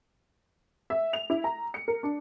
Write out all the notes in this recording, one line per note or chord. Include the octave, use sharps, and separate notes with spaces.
E5
F7
E4
A#5
C#7
A#4
D4